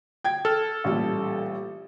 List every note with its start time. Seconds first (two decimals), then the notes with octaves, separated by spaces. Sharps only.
0.24 G5 G#6
0.45 A4 F6
0.84 A1 A#2 G3